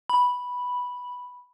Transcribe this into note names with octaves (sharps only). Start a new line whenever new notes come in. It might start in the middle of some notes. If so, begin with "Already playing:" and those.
B5